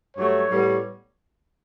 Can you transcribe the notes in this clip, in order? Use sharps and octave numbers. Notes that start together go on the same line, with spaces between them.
G2 F#3 A3 C#5
A2 G3 B3